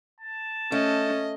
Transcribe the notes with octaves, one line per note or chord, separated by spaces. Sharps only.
A5
A3 C#4 D#5